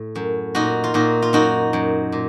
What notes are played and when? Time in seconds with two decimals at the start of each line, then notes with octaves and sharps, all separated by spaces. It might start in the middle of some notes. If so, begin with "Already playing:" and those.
Already playing: A2
0.15 F#2
0.55 A#2 D#4 F#4
0.84 F4
0.94 A#2 D#4 F#4
1.22 F4
1.33 F#2 D#4 F#4
1.73 F#2
2.12 A#2